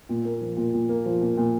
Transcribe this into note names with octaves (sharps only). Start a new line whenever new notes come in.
A#2
A#3
F3
A#2
A#2
A#3
F3
A#2
A#2